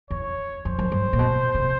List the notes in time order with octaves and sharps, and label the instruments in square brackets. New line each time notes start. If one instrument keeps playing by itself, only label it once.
[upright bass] E2 [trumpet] C#5
[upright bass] F2 [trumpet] C5
[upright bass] F#2
G2
A#2
B2
C3